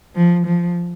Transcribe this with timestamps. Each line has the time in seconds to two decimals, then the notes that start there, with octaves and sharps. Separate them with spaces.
0.15 F3
0.46 F3